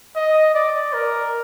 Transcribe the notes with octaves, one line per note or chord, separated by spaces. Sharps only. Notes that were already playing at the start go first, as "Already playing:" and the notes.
D#5
D5
A#4